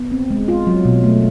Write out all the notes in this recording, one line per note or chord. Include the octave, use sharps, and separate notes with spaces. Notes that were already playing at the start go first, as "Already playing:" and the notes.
Already playing: B3
C4
G#3
F4
F#3
B2
A3